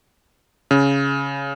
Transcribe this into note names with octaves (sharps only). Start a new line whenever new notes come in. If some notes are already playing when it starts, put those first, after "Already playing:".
C#3